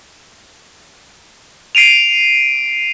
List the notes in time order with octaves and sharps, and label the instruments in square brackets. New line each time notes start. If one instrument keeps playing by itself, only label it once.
[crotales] C7 D7 D#7 F7